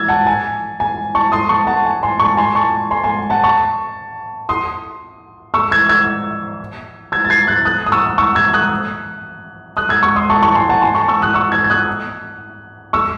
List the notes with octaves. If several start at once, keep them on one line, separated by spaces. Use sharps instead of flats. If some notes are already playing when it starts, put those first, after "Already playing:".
Already playing: E6 G#6 A6
F#5 A5
G#5
G#5
A5 C#6
C6 D#6
A5 C#6
F#5 A5
G#5
G#5 C6
A5 C#6
G#5 C6
A5 C#6
G#5 C6
G#5 C6
F#5 A5
A5 C#6
C6 D#6
C#6 E6
E6 G#6
E6 G#6
E6 G#6
A6
G#6 C7
F#6 A6
D#6 F#6
D#6
C#6 E6
C#6 E6
E6 G#6
D#6 F#6
D#6 F#6
E6 G#6
C#6 E6
C6 D#6
A5 C#6
A5 C#6
G#5 C6
F#5 A5
G#5 C6
A5 C#6
C#6 E6
D#6 F#6
C#6 E6
E6 G#6
G#6
D#6 F#6
C#6 E6